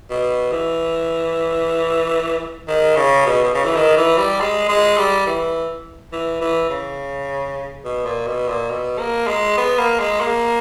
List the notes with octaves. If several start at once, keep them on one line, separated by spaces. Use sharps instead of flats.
B2
E3
D#3
C#3
B2
B2
C#3
E3
D#3
E3
G3
G#3
G#3
G3
E3
E3
E3
C#3
B2
A#2
B2
A#2
B2
A#3
G#3
B3
A#3
G#3
A#3